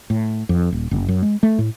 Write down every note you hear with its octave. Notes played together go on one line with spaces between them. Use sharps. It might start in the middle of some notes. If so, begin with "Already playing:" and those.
A2
F2
D#1
F#1
F#2
G#3
A3
A2